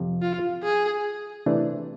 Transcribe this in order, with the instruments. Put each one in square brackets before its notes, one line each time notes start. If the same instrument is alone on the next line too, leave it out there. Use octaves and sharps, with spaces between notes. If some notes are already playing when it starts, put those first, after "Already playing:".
Already playing: [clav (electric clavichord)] F2 C3 F3
[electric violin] F4
G#4
[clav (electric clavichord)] C3 E3 A3 D4